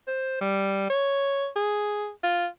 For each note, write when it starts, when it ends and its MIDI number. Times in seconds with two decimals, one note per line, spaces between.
0.07 0.39 72
0.41 0.87 55
0.90 1.47 73
1.56 2.09 68
2.23 2.46 65